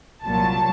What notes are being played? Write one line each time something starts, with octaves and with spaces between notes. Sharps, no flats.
C2 A#2 F#3 A5